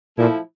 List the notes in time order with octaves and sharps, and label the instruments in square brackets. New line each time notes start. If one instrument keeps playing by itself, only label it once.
[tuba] A#2 [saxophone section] F3 A3 E4